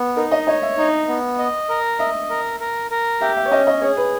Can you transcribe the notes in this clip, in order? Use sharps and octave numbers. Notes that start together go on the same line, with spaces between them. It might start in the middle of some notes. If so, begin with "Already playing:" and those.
Already playing: B3
D#4 A#4
D#5
C#5 D#5
E5
D#4
B3
D#5
A#4
D#5 E5
A#4
A#4
A#4
G4 E5
E5
C#5
C#4 D#5
D#5
G#4 C#5
B4